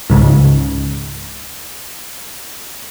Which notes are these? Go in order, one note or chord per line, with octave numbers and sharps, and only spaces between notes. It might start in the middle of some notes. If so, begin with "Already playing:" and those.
C#2 G#2 C#3